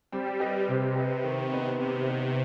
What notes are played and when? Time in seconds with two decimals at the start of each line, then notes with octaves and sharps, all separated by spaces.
0.12 G3 C4
0.40 G4 B4 D#5
0.68 C3 C4
0.96 G4 B4 D#5
1.24 D#3
1.52 B3 D#4 B4
1.80 C3 D#3
2.09 B3 D#4 B4